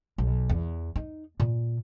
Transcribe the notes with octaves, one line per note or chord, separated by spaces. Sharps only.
B1
E2
D#4
A#2